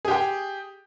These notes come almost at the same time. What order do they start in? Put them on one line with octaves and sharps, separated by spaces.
G#4 G4 G5